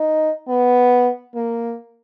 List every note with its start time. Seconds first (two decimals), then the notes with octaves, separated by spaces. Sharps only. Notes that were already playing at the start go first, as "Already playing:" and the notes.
Already playing: D#4
0.48 B3
1.35 A#3